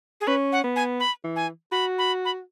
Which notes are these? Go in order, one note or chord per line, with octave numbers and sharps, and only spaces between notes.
G#4
C#4 B4
F#5
B3
G#5
B5
E3
G#5
F#4 B5
B5
B5